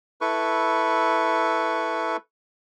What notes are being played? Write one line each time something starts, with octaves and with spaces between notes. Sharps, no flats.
E4 A4 B4 C#6